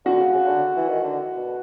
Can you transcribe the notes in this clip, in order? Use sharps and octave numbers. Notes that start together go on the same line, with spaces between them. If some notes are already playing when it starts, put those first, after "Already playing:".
D3 F#4
C#3
C#3
D3
E3
D#3
D3
B2